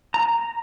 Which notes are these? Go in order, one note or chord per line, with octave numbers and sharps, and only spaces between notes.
A#5